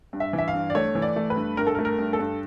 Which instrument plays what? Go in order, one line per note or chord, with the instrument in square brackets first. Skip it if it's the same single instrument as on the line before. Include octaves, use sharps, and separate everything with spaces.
[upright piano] G2
E5
E3
E5
F5
G2
D5
A3 C#5
E3
D5
A3
B4
G2
G2 A#4
A4
A#4
A3
A#4
G2
A4
G2